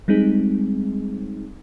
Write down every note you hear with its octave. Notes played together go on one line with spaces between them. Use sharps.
G3 G#3 C4 D#4 G#4